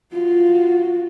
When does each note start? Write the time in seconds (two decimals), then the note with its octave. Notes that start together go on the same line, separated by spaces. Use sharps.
0.13 F4 F#4